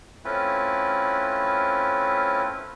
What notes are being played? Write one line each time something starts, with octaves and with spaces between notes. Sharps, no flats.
A3 C4 C#4 E4 F4 B4